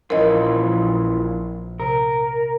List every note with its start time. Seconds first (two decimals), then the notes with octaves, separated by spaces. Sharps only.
0.10 A#1 E3 C#4 F4 A#4 D#5
1.80 C3 A#4